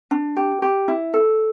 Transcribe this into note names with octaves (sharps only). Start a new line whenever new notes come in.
D4
G4
G4
E4
A4